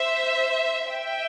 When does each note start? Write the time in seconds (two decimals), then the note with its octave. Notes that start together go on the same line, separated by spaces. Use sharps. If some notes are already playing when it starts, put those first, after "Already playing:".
Already playing: C5 E5
0.90 E5 G5